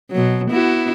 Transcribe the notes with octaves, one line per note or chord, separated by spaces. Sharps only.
B2 F#3
B3 E4 F#4